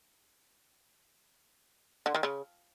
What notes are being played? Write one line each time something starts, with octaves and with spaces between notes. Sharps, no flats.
D3
D#3
C#3